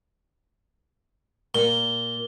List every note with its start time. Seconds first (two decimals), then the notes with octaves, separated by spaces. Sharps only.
1.55 A#2 G7